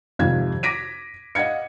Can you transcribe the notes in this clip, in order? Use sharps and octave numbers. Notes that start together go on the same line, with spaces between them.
G#1 F2 C3 F5 G#6
D6 A#6 B6 D7 D#7
D#5 F5 F#5 G#6 C#7